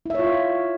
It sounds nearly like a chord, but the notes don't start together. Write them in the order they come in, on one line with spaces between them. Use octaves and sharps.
E4 E5 C#5 F4